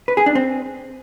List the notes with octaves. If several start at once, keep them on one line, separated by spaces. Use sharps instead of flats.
B4
G#4
D4
C4